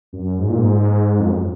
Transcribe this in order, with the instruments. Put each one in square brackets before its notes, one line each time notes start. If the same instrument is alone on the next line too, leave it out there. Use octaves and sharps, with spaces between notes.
[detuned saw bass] F#2
G#2
A#2
G#2
F2
F#2